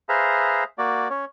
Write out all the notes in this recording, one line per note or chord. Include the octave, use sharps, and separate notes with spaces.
G#4 B4 C5 E5 F5 A#5
A#3 F#4 D5
C#4 C#5